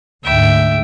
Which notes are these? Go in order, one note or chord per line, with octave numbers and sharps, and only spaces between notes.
D2 G#2 E5 G5